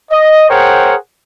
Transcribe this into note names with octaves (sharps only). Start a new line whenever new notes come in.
D#5
G#4 A#4 C5 C#5 F#5 G5